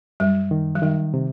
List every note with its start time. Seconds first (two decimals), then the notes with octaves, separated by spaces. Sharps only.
0.20 F#2 G3
0.51 D#3
0.75 F#3
0.82 D#3 G3
1.14 C3